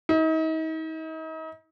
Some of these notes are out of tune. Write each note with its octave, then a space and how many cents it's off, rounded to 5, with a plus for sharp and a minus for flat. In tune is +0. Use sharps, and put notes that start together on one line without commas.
D#4 +40